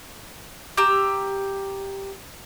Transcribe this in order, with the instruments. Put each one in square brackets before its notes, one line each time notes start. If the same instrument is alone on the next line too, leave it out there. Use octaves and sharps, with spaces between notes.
[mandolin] G4 A#5 E6